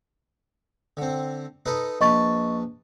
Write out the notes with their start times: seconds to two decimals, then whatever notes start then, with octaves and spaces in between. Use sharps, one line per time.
0.97 D3 C4
1.66 D#4 A4 B4
2.01 A#1 B4 D#5 A5 C#6 A6